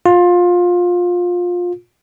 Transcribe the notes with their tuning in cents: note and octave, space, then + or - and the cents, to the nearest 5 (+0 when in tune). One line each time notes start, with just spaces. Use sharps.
F4 +20